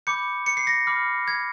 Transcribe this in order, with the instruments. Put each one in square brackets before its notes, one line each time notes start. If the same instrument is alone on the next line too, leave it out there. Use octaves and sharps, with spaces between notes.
[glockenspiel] B5 D6 G6 C#7
C#7
C7
A#6
B5 D6 F6
G#6